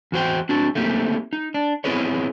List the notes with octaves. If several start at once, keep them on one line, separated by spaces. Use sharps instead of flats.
E2 F#4 C5 G5
C4 D4 F#4
A3 A#3 C4 D#4 G4
D#4
D4
B3 C4 E4 G#4 B4 C#5